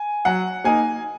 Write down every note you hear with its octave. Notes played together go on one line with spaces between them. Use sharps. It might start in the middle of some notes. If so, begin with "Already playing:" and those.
Already playing: G#5
F#3 F#5
A#3 D#4 G#5